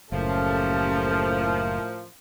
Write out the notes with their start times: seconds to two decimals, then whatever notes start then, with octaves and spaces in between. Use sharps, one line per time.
0.12 F#1 A2 F3 C#4 G4 A4 A#4 E5